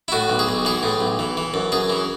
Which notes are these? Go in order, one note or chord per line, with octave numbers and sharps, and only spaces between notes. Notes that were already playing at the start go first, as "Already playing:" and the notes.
E4
A2 F#4
B1
G#4
B1
E3 G#4
A2
B1
E3
E3
F#2
F#2 G#4
E3